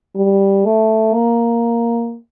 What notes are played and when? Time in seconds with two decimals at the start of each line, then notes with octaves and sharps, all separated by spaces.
0.16 G3
0.65 A3
1.14 A#3